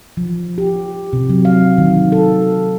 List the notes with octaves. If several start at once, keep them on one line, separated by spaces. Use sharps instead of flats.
F3
G4
C3
F#3
F5
D#3
A4